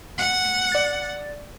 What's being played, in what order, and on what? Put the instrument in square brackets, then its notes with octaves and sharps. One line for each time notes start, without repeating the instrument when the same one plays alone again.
[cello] F#5
[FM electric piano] D5 A6